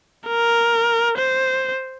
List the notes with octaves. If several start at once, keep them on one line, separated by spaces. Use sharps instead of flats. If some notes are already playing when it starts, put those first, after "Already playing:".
A#4
C5